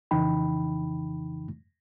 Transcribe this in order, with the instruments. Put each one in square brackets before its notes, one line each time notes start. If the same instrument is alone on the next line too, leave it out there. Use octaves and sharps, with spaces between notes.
[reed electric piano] F2 C#3 E3 D#4 G5 B5